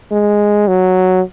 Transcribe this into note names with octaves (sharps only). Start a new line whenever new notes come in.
G#3
F#3